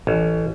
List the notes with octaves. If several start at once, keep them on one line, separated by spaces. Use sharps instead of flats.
A1